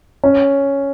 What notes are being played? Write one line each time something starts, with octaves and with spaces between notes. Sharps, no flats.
C#4